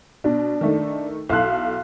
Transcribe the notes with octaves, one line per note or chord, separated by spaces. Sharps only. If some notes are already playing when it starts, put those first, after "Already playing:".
B2 D4
D#3 A3 D#4
B1 E4 A4 F5 C6 F#6